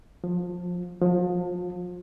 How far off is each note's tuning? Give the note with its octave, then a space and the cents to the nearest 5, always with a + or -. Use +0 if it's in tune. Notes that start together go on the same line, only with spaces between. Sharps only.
F3 +25
F3 +35